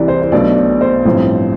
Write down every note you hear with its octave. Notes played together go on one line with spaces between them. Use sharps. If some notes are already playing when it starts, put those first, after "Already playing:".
Already playing: C2 C3 E3 D5
C5
C5
B1 B2 A3 D4 D5
D5
C5
A1 G2 F3 C4